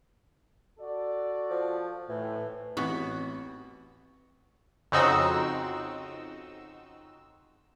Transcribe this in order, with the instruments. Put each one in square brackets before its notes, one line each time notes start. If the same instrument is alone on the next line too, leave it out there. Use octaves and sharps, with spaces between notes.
[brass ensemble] F#4 A4 D5
[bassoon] F3
[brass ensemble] A2 [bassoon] E3
[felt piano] A1 [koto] B3 F#4 [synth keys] C4
[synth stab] F2 C#3 C4 D#4 F#4 E6